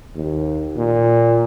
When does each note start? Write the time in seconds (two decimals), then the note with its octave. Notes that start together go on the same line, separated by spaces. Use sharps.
0.15 D#2
0.77 A#2